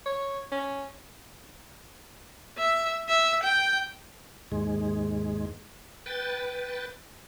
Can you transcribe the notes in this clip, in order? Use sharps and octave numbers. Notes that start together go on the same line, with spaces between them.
C#5
C#4
E5
E5
G5
D#2 G#2 G#3
B4 G5 A6